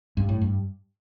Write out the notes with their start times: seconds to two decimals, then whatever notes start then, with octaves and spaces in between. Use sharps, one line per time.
0.17 G2
0.29 A2
0.41 G2